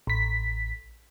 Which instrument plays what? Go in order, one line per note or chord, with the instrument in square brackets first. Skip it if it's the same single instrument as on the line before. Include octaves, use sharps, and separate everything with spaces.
[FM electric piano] A1 B6